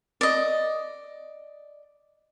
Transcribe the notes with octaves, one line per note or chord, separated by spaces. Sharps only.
D5 D#5